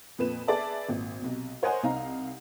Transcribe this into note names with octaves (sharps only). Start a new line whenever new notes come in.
F2 A#2 B4 E7
G#4 B4 D5 E5 A5
G#1 A#2
B1 C3
A#4 C5 C#5 D#5 F#5 G#5
C2 D#4 F5 A#5